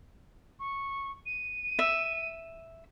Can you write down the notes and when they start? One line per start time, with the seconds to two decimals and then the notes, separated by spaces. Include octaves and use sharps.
0.60 C#6
1.26 D#7
1.79 E5